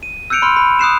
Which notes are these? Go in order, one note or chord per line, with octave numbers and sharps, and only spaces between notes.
D#7
E6 F#6 G6 C#7 D7 F7
B5 C6 F6
B5
D#6 F#6 C7 E7